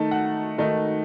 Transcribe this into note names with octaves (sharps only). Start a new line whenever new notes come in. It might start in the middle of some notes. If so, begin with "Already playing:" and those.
Already playing: D#3 A3 D#4 A5
F#5
D#3 A3 D#4